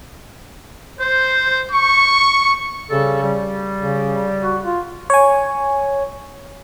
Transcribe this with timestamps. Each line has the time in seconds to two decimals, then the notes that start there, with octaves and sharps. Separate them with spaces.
0.98 C5
1.71 C#6
2.90 C#3 G3 A4
3.22 G3
3.79 C#3
4.43 F#4
4.64 F4
5.10 C#5 G#5